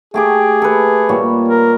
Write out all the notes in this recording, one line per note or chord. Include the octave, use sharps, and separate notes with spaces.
A3 G4 G#4 D6
A4 B4
A#2 G3 C#5
A#4